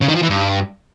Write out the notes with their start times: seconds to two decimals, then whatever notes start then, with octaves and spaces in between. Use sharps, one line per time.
0.01 C#3
0.08 D#3
0.15 F3
0.22 E3
0.29 G2